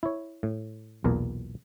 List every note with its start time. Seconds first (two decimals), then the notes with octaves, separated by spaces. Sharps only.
0.03 E4 C#5
0.43 A2
1.04 B1 E2 A#2 A#4